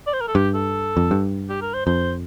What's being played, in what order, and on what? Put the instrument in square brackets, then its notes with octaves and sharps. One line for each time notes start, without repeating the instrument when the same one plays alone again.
[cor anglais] D5
C5
A#4
A4
[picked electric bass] G2 [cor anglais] G4
[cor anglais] A4
[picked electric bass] F2
G2
[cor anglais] G4
A#4
C5
[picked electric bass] F2 [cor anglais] C5